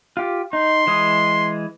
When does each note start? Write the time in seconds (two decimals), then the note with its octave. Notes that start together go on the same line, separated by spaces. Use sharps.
0.17 F4 G4
0.53 D#4 C6
0.87 E3 G#3 D#6